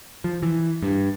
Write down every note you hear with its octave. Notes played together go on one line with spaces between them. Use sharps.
F3
E3
G2